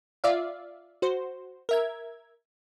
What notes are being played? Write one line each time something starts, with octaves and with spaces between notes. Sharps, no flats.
F4 D5 E5 F5
F#4 C5
A#4 E5 G#6